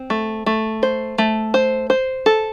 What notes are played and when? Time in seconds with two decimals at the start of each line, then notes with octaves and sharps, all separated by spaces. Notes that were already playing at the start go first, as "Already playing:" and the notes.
Already playing: C4
0.10 A3
0.46 A3
0.83 C5
1.18 A3
1.54 C5
1.90 C5
2.26 A4